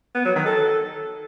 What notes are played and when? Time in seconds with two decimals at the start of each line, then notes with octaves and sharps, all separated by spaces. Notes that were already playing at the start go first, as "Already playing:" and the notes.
0.15 B3
0.25 F#3
0.36 D#3
0.46 A4